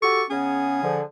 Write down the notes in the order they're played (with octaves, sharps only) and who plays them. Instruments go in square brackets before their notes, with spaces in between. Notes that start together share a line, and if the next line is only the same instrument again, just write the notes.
[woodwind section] F#4 G4 A4 [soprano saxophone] C#6
[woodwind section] C#3 B3 C#4 [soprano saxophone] G#4
[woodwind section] D3 F3